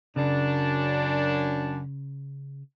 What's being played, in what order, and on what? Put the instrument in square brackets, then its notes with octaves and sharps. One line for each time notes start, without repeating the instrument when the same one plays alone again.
[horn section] F#2 D4 [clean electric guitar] C#3